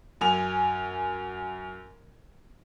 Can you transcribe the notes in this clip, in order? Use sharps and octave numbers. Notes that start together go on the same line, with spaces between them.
F#2 G#5 F7